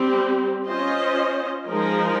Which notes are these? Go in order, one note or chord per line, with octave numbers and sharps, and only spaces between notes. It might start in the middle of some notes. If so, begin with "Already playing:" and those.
Already playing: G3 C4 G4
C#4 F4 C5 D#5
F3 G#3 D#4 A#4